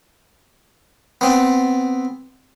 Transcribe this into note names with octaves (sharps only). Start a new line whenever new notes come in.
B3 C4